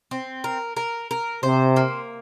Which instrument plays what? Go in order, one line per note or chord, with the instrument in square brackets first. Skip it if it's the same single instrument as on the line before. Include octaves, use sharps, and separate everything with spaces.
[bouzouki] C4
A#4
A#4
A#4
[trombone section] C3 [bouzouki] C5
[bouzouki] A#3